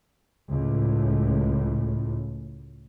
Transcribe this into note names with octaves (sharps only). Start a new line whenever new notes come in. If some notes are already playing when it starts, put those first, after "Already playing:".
C#2 A2